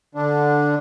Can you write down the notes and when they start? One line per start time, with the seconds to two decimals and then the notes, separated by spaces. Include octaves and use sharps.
0.15 D3 D4